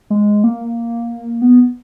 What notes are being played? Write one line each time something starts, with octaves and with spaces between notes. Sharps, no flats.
G#3
A#3
B3